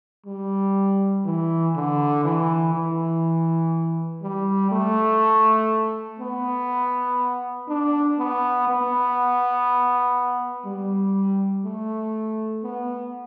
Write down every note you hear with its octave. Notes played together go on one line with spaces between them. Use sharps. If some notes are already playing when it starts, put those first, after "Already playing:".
G3
E3
D3
E3
E3
G3
A3
B3
D4
B3
B3
G3
A3
B3